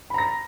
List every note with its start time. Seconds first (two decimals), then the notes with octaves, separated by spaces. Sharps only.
0.10 B5
0.14 A#5
0.18 A#6